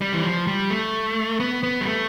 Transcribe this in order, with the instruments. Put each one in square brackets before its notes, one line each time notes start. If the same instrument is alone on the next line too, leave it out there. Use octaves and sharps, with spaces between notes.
[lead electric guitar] G3
E3
F3
G3
A3
B3
B3
G3
A3